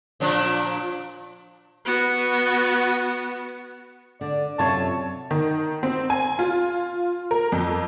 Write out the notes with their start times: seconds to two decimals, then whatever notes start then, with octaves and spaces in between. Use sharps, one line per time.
0.20 A#2 F3 D4
1.85 B3 F#4
4.21 D3 D5
4.59 F#2 C3 F4 A4 C#5 A5 C#6
5.31 D#3
5.83 C4
6.10 G#5
6.39 F4
7.31 A#4
7.52 F2